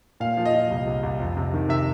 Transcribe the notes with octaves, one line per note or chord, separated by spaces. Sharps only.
A#2 F5
F3
D#5
F3
C2
C2
C2
F2
C3
D#3
C3 E5